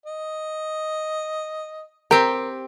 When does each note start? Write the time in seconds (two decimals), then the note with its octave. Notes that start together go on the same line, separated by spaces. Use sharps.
0.06 D#5
2.11 C4 G4 A#4